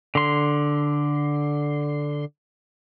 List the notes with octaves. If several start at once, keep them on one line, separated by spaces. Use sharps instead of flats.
D3 C6